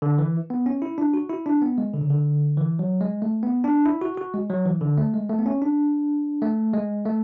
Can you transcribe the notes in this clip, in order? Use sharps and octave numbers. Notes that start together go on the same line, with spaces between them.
D3
E3
B3
C#4
E4
D4
F#4
E4
D4
B3
G#3
D3
C#3
D3
E3
F#3
G#3
A3
B3
D4
E4
F#4
F#4
G#3
F#3
E3
D3
A3
G#3
A3
B3
C#4
D4
A3
G#3
A3